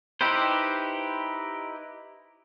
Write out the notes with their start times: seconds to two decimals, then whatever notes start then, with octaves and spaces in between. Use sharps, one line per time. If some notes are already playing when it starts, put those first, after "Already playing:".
0.21 D#4 E4 G4 B4 C5